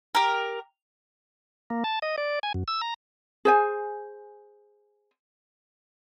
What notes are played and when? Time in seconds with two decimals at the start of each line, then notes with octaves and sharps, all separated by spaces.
0.15 G4 A#4
1.70 A#3
1.84 A5
2.02 D#5
2.18 D5
2.43 G#5
2.54 F#2
2.68 E6
2.81 A#5
3.45 G#4 C5 G#5